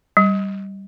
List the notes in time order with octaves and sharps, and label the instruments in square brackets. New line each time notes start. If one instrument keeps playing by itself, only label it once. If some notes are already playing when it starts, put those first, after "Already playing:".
[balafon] G3